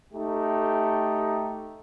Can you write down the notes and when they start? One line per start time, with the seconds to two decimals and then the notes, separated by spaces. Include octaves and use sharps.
0.13 A3 D#4 G4